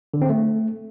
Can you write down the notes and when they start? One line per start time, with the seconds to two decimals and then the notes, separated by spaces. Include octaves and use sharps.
0.14 D3
0.22 C4
0.30 A3